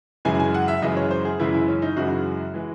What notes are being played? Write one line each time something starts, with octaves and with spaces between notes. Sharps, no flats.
F#2 C#3 E3 G#3 G#5
G#5
F#5
E5
F#2 C#3 E3 G#3 D#5
C#5
C5
G#4
F#2 C#3 E3 G#3 E4
E4
C#4
D#4
F#2 C#3 E3 G#3 F#4
E3 G#3